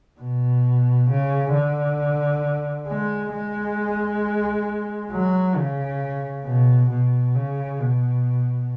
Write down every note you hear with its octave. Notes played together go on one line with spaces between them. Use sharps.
B2
C#3
D3
G#3
G#3
F#3
C#3
B2
B2
C#3
B2